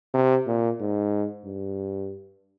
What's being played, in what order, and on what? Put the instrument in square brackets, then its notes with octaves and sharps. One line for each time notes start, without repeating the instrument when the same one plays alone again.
[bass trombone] C3
A#2
G#2
G2